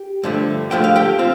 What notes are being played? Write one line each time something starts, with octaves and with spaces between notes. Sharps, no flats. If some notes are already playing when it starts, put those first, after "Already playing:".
Already playing: G4
G2 D3 F3 A3
G2 D3 F3 A3 G5
F5
G4 G5
C4 F4